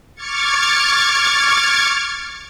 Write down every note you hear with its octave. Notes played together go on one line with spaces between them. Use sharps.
C#6 D6 F6 G#6 A6 C#7